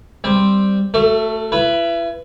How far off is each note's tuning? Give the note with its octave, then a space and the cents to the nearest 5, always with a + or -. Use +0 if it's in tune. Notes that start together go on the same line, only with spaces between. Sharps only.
G3 +0 C4 +0
A3 +10 F#4 +0 A4 +45
E4 +35 B4 +0 B5 +0